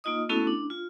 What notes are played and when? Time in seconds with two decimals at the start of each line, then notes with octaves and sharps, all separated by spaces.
0.04 A#3 D#4 F4 D#5 D#6
0.29 A3 B3 C#4 E4 F#4 A4
0.47 D4
0.70 F4